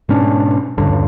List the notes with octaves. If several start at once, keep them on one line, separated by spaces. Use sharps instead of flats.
G#2 B2 C#4 D4
D#1 C#2 G2 D3